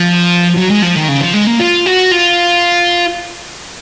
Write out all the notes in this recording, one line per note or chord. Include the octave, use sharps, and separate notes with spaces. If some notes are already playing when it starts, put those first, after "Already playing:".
Already playing: F3
F#3
G#3
F3
D#3
C#3
F3
G#3
A#3
F4
F#4
F4